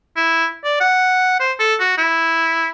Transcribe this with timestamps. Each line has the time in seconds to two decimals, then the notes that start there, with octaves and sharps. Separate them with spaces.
0.17 E4
0.64 D5
0.81 F#5
1.40 C5
1.59 A4
1.80 F#4
1.98 E4